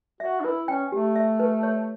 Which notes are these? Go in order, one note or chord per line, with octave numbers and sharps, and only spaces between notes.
F#4 E5
D4
E4 B4
C#4 G5
A3 G4
E5
B4
C#5